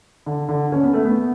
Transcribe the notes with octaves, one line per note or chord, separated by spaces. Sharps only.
D3
D3
C#4
B3
A3
B3